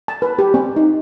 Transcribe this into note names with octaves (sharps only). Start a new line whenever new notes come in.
A5
B4
G4
C4
D#4